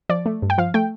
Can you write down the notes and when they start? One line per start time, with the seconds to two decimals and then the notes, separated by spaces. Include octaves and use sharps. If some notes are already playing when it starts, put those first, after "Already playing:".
0.09 F3 D5
0.26 A3
0.42 G2
0.50 G5
0.58 F3 F5
0.74 A3 G5